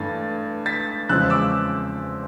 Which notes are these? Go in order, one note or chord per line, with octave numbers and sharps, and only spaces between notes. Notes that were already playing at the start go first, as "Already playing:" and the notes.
Already playing: G2 E3 A3 A6
A6 B6
E2 C#3 F3 G#3 C4 E6 F#6
D6 E6